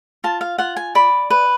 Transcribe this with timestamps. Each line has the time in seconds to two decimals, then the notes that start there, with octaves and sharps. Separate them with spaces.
0.24 F4 A5
0.41 F5
0.58 F4 F#5
0.77 G#5
0.95 D5 B5
1.30 B4